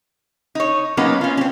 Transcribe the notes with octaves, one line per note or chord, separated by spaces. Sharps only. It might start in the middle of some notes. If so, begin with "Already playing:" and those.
D#4 C#5
F#3 A#3 B3 C#4 D#4
C#4 F4
C4 C#4